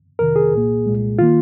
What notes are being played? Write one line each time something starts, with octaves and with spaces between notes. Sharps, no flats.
F2 C3 D#3 A#4
G#4
C2 A#2 A#3
C2 A#2 G#3
D#3 A#3 F4